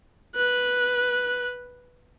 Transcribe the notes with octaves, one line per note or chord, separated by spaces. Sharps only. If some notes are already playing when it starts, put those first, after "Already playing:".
B4 F#6